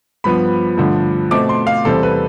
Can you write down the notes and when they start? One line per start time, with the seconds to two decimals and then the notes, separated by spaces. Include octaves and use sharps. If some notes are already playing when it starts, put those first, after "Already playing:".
0.24 G2 F3 B3 B5
0.77 G2 D3 F3 A3
1.31 B2 A3 C4 D6
1.49 C6
1.67 F5
1.85 E2 C3 G3 C4 A4
2.03 B4